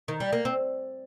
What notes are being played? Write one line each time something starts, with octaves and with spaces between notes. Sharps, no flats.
D#3
G3
A#3
C4